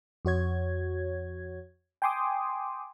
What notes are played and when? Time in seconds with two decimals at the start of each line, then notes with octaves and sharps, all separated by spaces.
0.25 F2 F#4 C#5 G#6
2.02 G5 G#5 C6 D6 D#6